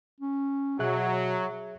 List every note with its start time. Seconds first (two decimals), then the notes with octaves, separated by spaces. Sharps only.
0.21 C#4
0.79 B2 F#3 G#4 E5 F#6